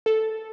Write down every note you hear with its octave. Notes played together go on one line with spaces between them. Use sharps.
A4